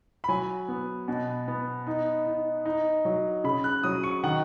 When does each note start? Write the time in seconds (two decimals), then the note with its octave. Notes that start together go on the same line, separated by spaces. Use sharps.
0.24 B5
0.28 F#3 G#5
0.68 B3
1.08 B2
1.48 B3
1.87 D#4
2.26 D#4
2.65 D#4
3.05 F#3
3.44 C#3 B5
3.64 F#6
3.83 F#3 D#6
4.03 C#6
4.23 D#3 F#5